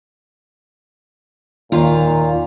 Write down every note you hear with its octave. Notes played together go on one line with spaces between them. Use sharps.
D#2 A#2 F4 A#5